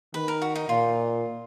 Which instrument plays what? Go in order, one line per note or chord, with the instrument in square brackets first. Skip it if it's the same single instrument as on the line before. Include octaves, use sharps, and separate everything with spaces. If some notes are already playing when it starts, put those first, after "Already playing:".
[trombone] D#3 [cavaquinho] B4
[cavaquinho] A#4
F#4
D#4
[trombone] A#2 [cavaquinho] F4